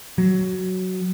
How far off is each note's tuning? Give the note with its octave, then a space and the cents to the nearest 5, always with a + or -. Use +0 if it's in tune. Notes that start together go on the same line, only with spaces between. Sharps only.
F#3 +5